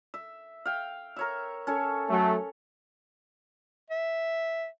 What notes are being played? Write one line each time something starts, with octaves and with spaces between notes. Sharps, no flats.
E5
F5 G5
A#4 C#5 E5
C#4 A4 C#5
F#3 A3
E5